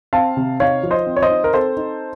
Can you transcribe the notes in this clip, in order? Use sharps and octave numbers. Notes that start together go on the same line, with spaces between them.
C4 F5 A5
C3
D#4 C#5 F5
F3
C5 D#5
C4
C#5
C5 D#5
D#4
A#4
C4 A4 C5
D#4